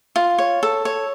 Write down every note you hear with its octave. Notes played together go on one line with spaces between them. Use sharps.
F4
C#5
A4
C#5